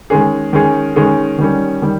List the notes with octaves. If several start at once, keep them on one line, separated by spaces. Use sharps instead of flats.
D#3 G#3 C#4 G#4
D#3 G#3 C#4 G#4
D#3 G#3 C#4 G#4
D#3 G3 C#4
D#3 G3